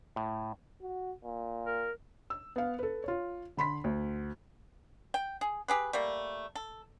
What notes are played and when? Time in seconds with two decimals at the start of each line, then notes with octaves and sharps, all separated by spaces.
0.16 A2
0.81 F#4
1.24 A#2
1.65 A#4
2.30 E6
2.56 B3 F5
2.79 A4 B4
3.04 F4 C#5
3.57 D3 B5 C6 B6
3.84 D2
5.14 G5
5.41 G#4
5.68 G4 G#4 B4
5.93 G3 A3 A#3
6.55 A4